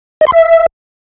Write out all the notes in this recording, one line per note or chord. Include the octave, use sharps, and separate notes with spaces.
D#5
C6
E5